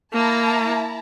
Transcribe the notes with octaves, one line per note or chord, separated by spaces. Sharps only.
A#3 E4 A5 A#5